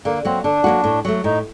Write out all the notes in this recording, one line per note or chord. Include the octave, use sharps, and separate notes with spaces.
D3 A#3
F#3 A#3 C4 F#4
D3 D4
F#3 A#3 F#4
A2
F#3 A3
A2 D#4